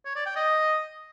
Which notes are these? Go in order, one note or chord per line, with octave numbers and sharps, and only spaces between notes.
C#5
D5
G5
D#5